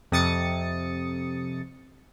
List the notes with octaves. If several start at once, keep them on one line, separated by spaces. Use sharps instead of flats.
F2 C3 D#6 A6 C#7